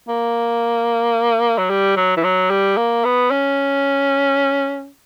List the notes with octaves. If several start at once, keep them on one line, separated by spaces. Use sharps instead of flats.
A#3
F#3
G3
F#3
E3
F#3
G3
A#3
B3
C#4